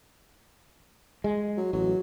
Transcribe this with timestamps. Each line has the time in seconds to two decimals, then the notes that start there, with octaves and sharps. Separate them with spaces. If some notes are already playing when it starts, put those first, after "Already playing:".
1.24 G#3
1.57 F#3
1.73 A1 F#3